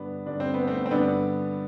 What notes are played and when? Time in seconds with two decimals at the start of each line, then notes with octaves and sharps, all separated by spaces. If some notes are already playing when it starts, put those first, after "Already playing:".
Already playing: G2 D3 B3 D4
0.26 G2 D3 D4
0.40 C4
0.54 B3
0.67 A3 C4
0.86 C4
0.91 G2 D3 B3 D4